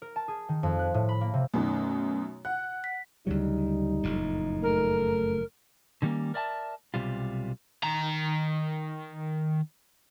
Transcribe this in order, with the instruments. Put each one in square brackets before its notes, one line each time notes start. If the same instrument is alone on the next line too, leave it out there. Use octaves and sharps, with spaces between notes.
[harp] A#4
A5
G#4
D#3
F2
F#6
A2
B5
A#3
C3
[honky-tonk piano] F#2 B2 D#3 [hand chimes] A3 C#4
[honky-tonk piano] F#5 [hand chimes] F#6
[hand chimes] B6
[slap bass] D2 C#3 F#3 [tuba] G3 [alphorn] D#4
[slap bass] F#1 F2 A2
[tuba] A3 [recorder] A#4
[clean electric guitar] D3 D#3 G3 G#3 A#3 C#4
A#4 D5 E5 G#5 A5
B1 C3 G3 F4
[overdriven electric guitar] D#3 A#5